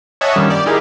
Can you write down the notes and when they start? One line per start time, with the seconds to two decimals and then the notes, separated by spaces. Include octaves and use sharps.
0.21 C#5 D#5 E5 F#5 G#5 A5
0.36 G2 A#2 D#3 G3 C#4
0.50 G4 D5
0.66 D#4 E4 G4 G#4 A#4 F5